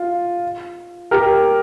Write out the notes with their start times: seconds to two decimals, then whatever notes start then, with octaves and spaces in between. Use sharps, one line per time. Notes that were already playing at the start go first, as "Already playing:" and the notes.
Already playing: F4
1.11 G4 A#4